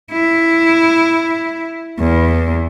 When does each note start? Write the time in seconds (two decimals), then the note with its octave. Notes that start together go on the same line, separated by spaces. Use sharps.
0.11 E4
1.99 E2